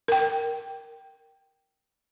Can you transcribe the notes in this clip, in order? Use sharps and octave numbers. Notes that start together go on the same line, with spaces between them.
A#4 G5